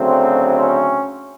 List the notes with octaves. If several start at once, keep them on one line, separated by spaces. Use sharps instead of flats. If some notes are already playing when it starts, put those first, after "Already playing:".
Already playing: D2 C#3 F#3 A3 C4
C#4